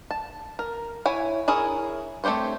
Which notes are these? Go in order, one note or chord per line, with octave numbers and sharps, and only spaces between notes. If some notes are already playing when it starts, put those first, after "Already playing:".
A5
A#4
E4 C#5 G#5
E4 G#4 A#4 C#5
A3 C4 G4 C5 C#5